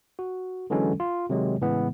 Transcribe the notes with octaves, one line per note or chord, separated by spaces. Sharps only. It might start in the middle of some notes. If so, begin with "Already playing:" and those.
F#4
D3 E3 F#3 G#3 C#4 A4
F4
C3 D#3 F#3 G#3
A2 C#3 E3 G#3 B3